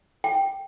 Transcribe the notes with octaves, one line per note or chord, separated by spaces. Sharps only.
G5